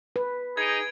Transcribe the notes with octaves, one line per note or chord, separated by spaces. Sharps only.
B4
D#4 G#4 G#6 D7